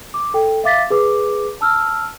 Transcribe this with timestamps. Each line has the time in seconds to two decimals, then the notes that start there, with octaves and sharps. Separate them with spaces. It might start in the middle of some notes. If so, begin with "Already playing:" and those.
0.14 D6
0.34 A4 G5
0.64 E5 F5 D6 A6 B6
0.90 G#4 B4 D6
1.61 A5 E6 F6